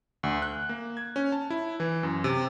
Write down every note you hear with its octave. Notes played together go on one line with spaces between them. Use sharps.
D2
F#6
A#3
G#6
C#4
A5
E4
E3
F#2
C3